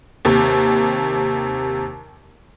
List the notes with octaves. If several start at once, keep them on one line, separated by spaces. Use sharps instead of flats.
D#2 C3